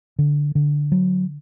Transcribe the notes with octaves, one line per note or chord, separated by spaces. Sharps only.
D3
D3
F#3